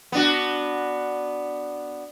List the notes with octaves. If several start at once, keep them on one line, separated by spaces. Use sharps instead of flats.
B3 D4 F#4